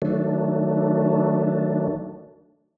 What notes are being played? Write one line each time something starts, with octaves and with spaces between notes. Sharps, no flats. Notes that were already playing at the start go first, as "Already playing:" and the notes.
D#3 F#3 A3 D4